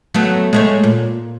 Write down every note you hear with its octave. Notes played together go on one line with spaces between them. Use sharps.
F#3 A3 B3
G#3 A3 C#5
A#2